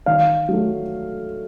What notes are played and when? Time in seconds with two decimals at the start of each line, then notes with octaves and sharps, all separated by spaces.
0.06 D#3 F5
0.49 F#3 A3